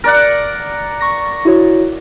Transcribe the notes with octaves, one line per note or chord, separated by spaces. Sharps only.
A#4 D5 F#5
C#6 A#6
E4 F#4 C#5